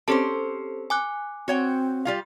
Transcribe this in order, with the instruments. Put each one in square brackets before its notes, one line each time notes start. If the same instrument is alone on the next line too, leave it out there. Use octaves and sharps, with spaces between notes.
[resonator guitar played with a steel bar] C4 C#4 C5 [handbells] G4 A4 A5
[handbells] G#5 D6 F#6
[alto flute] C4 [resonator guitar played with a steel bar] F#4 C#5 G5
[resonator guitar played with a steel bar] G3 F4 F5